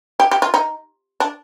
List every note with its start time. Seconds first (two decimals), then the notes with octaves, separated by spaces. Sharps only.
0.20 G4
0.31 G4
0.42 F4
0.54 D#4
1.20 D4